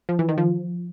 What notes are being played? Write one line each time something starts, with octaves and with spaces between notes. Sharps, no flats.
F3
E3
D#3
F3